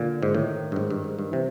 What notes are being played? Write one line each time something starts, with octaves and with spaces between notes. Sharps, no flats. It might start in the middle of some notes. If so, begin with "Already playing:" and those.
Already playing: A#2 D3
G#2
A2 D#3
G2
G#2
G2
G#2
G2 D#3
C3 E3